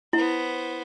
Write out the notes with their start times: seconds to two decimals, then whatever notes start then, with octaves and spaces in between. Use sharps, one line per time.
0.13 B3 E4 C5